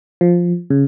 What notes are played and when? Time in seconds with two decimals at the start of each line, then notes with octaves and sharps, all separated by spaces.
0.21 F3
0.70 C#3